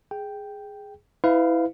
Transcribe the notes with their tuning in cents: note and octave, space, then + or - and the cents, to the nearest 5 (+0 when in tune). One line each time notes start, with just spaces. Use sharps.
G#4 +0 G5 +0
E4 -10 B4 +35 F5 +0